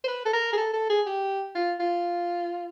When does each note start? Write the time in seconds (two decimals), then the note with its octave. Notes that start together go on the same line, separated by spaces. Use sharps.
0.04 C5
0.08 B4
0.25 A4
0.33 A#4
0.53 G#4
0.57 A4
0.73 A4
0.90 G#4
1.06 G4
1.55 F4
1.80 F4